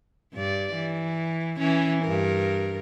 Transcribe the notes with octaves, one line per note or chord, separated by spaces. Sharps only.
G2 D5
E3
E3 C#4
G2 A#4